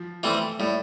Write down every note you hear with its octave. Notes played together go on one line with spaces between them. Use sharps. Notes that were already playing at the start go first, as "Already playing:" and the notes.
Already playing: F3
E3 G3 A3 C4
A2 G3